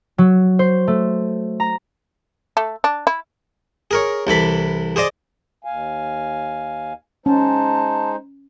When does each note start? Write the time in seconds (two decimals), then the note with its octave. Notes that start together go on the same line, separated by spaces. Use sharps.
0.18 F#3
0.59 C5
0.87 A3
1.60 A#5
2.57 A3
2.84 D4
3.07 E4
3.91 G#4 A#4 C#5
4.27 C2 E3 A4 B5
4.96 G#4 C5 D5 D#5
5.64 D#2 F5 G#5
7.26 G#3 C#4 D#4 C5 A5